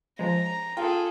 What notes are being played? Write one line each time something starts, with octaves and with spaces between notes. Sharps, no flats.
F3 G#3 A#5
F4 G#4 A4 G5